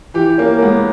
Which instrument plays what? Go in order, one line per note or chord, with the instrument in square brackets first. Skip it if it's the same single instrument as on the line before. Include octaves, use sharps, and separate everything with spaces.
[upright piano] E3 [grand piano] G4
[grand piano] A#3 [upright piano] C#4
[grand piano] A#3
[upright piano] G#3 [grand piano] B3